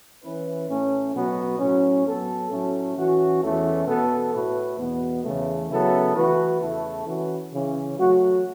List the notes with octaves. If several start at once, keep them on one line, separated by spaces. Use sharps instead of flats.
E3 C#4 E4 B4
A2 A3 C#4
B2 F#3 B3 F#4
A2 F#3 C#4
F#3 B3 A4
A2 F#3 A3 C#4
E3 C#4 F#4
E2 E3 A3 C#4 A4
B2 B3 A4
A2 A3 F#4 B4
E2 B2 B3
E2 C#3 E3 A3
C#3 F#3 B3 E4 A4
E3 A3 F#4 B4
E2 C#3 A3 E4 A4
E3 C#4 F#4 B4
C#3 E3 C#4
F#3 A3 F#4